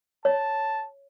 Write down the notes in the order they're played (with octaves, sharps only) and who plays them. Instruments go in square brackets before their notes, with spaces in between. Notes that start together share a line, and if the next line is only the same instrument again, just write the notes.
[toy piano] C#5 [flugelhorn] A5